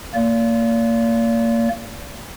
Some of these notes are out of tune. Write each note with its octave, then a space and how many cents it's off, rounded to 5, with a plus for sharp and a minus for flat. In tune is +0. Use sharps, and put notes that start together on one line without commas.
A#3 -20 D5 -35